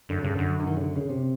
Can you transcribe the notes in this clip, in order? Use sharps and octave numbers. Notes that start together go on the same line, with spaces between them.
F#2 D3
G2 C#3
F#2 D3
D3
D#3
C#3
D3
C#3
C3